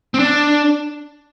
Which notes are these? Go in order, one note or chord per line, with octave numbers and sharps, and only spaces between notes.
C4
D4